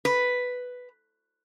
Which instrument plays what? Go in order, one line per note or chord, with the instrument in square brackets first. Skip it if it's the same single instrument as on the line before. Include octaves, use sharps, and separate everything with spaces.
[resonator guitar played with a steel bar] B4